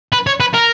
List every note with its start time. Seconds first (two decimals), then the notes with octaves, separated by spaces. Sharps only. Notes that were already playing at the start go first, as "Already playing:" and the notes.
0.12 B4
0.27 C#5
0.40 B4
0.54 A#4